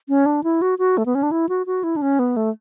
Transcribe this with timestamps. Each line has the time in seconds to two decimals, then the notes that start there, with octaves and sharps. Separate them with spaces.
0.09 C#4
0.26 D4
0.44 E4
0.62 F#4
0.79 F#4
0.98 A3
1.06 B3
1.15 C#4
1.23 D4
1.31 E4
1.49 F#4
1.66 F#4
1.84 E4
1.96 D4
2.02 C#4
2.19 B3
2.37 A3